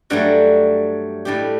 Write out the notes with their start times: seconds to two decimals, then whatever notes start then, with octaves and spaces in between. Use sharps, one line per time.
0.10 G2 F#3 A3 D4 F#4
1.25 A2 G3 D4 G4